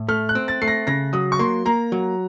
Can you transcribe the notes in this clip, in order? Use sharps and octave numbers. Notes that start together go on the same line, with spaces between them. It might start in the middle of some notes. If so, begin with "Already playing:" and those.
Already playing: A2
A3 F6
F#6
C4
A6
A3 C7
A#6
C#3 A#6
F#3 D#6
C#6
A#3 C6
A#3 A#5
F#3